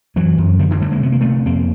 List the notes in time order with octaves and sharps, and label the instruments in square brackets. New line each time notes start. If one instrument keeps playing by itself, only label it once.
[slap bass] F#2 E3 F#3
F#2
D3 D#3 F3
D3 E3
D3 G3 A3
G#3 A#3
C3 B3
A#3
C3 A3 B3
F2 A#3 C4